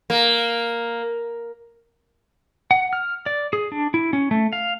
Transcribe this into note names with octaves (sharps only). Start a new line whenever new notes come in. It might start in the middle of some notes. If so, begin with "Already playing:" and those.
A#3
F#5
F6
D5
G#4
D4
E4
C#4
A3
F5